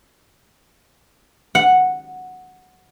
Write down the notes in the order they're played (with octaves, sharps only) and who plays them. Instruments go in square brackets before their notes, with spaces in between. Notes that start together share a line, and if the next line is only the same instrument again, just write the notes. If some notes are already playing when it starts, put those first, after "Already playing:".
[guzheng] F#5